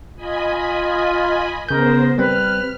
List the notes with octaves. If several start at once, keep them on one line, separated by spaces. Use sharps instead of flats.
F4 D#5 G#5 B5
C#3 B3 A#4 C5 G6
G3 C4 B4 F6